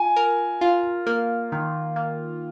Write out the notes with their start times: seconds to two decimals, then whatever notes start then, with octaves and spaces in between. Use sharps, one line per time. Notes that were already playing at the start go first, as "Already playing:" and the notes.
Already playing: F4 G#5
0.16 A#4
0.61 F4
1.06 A#3
1.52 D#3
1.96 A#3